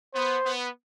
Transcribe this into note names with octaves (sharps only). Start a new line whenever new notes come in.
B3 C5
B3